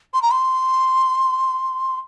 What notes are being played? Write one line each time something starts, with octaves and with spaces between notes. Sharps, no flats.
C6
A#5
C6